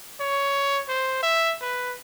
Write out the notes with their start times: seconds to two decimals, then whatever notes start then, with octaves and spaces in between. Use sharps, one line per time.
0.20 C#5
0.88 C5
1.23 E5
1.61 B4